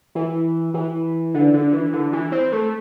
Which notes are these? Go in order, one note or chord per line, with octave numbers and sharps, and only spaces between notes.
E3
E3
D3
D3
E3
D3
E3
C4
A3